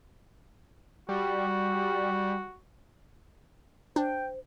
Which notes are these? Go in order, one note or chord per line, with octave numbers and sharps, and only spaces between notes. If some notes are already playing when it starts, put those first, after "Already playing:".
G3 F#4
D4 C5 G5